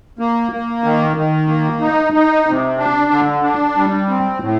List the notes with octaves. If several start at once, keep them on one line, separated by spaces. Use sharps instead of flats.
A#3
A#3
D#3
D#3
A#3
D#4
D#4
C3
D4
D3
D4
G3
C4
A2